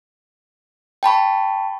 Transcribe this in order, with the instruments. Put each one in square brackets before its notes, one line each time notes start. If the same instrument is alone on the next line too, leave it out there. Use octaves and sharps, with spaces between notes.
[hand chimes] G5 A5 B5 C#6